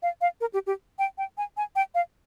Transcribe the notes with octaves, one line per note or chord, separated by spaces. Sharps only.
F5
F5
A#4
G4
G4
G5
G5
G#5
G#5
G5
F5